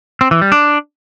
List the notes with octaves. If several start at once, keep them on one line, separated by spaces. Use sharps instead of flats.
C4
E3
G3
D4